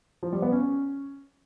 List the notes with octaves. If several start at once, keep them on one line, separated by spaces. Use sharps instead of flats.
F3
G3
B3
C#4